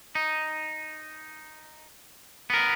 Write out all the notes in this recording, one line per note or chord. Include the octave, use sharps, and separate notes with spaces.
D#4
B3 A#4